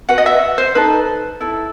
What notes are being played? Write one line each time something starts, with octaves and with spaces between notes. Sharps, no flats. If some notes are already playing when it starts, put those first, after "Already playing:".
F#4 B4 F#5
D#5
E5
C5
D#4 A4 B4
E4 A4